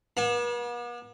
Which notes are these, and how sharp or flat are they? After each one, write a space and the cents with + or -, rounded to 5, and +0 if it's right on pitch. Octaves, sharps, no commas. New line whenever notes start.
B3 -45 A5 +0